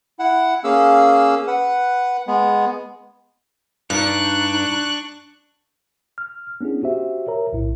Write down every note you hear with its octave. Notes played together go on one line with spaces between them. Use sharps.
E4 F#5
A#3 C#4 G#4 F5 E6
B4 F#5
G#3 B3
G2 D4 D#4 C#6 F#6
F6
B3 C#4 D4 E4 G#4
F#4 G4 C5 E5
A#4 C#5 E5 A#5
B1 A2 E4